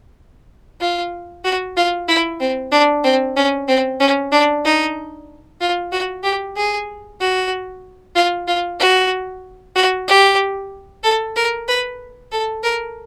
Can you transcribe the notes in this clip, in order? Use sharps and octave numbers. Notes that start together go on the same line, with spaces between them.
F4
F#4
F4
E4
C4
D4
C4
C#4
C4
C#4
D4
D#4
F4
F#4
G4
G#4
F#4
F4
F4
F#4
F#4
G4
A4
A#4
B4
A4
A#4